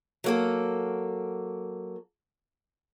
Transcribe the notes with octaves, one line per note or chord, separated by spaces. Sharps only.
F#3 A#3 A4